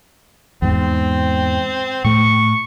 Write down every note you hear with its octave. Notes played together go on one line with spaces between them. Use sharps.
E2 G#2 C4
A2 A3 C#6